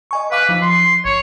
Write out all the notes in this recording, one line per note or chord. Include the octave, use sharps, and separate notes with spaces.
D#5 G#5 C#6
B4 F5 D6 B6
F3 D#4
C6
G#1 C#5